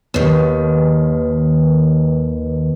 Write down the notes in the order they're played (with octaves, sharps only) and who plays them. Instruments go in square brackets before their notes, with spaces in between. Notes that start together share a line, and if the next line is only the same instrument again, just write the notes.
[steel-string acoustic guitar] D#2 D#3 [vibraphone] B4